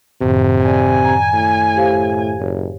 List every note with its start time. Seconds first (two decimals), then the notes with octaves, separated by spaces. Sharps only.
0.21 F#2 A2 C3 D#3
0.65 D5 G#5
1.04 A#5
1.34 A2
1.76 G4 C5 F5
2.40 F#1 C#5